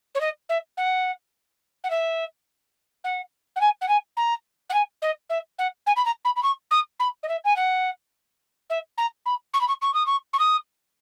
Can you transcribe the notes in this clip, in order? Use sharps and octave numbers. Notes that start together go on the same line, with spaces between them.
C#5
D#5
E5
F#5
F#5
E5
F#5
F#5
G#5
F#5
G#5
A#5
F#5
G#5
D#5
E5
F#5
G#5
B5
A#5
B5
B5
C#6
D#6
B5
D#5
E5
G#5
F#5
E5
A#5
B5
C#6
B5
C#6
C#6
D#6
C#6
C#6
D#6